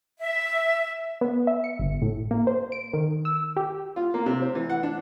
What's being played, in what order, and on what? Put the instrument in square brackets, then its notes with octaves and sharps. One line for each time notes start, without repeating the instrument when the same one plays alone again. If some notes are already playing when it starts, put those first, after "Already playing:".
[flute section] E5
[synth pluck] B3
E5
C#7
G1
A2
A#3
C5
D7
D#3
E6
G4
[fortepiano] F4
A#3
C3
C4
E3
F#5
D4